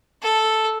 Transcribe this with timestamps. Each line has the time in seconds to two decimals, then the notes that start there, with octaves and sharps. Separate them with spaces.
0.22 A4